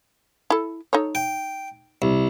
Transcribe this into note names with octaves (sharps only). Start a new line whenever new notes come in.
E4 A4
D#4 A4 C#5
G5
C2